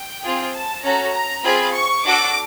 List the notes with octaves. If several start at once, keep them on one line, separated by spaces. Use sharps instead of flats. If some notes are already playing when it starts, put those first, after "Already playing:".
Already playing: G5
C4 F4 G#4
A5
C#4 F#4 A4 A#5
A#5
C4 F4 G#4 B5
C#6
D4 F#4 A4 D6